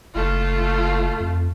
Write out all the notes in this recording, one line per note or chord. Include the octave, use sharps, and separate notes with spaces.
F#1 A3 F4
F2